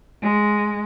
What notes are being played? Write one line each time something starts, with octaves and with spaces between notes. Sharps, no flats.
G#3